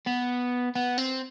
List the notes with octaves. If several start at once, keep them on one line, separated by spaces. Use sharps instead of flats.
B3
B3
C4